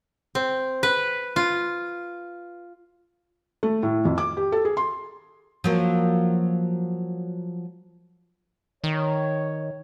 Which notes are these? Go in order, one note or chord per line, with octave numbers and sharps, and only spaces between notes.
C4
B4
F4
A3
A2
F2
D6
G4
A4
G#4
C6
F3 F#3 A#3
D#3 C#5